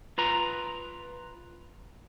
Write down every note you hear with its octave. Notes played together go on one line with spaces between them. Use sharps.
F4 B4 A#5